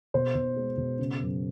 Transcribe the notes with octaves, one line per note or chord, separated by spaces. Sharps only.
B2 C5
B2
G#3
B2
C#3
F#2